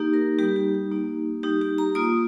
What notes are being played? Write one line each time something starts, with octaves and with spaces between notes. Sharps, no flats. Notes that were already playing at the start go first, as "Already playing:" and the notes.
Already playing: A#3 D#4 G4
A#4
G3 D#4 G4
G4
G4
A#3 D#4
G3 D#4 G4
G4
A#5
A#3 F4 D#6